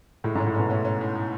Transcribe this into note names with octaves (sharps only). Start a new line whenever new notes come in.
A2 G#3
G#2
C#4
A2
B2 C#4
A3 C#4
C#4
A2
A2